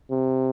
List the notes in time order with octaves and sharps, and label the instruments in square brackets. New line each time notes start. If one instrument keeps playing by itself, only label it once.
[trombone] C3